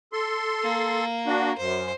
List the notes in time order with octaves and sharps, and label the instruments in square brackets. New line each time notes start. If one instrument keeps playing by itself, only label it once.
[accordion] A4 C6
[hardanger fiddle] A#3
[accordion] D4 F#4
[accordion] F#2 [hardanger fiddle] C5